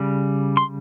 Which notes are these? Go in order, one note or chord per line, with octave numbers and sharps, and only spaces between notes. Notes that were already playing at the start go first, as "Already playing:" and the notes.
Already playing: C#3 G3
C6